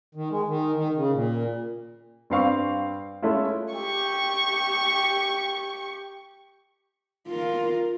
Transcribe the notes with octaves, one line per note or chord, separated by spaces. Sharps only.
D#3
G#3
D#3
D#3
C#3
A#2
G2 C4 F5 C#6
G#3 A3 C#4 E4 F4
G4 C#6
F4 A#4